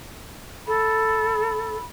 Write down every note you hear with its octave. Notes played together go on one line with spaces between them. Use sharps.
A4 B5